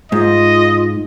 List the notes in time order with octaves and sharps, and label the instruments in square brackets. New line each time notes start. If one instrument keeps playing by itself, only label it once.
[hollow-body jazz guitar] G#2 [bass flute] F4 [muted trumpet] D#5